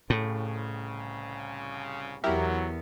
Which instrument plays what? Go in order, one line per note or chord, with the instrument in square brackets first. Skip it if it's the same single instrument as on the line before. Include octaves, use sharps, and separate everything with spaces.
[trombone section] C2 C#3 [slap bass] A2
[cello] E2 B3 [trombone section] F#3 [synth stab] E4 G4 A#4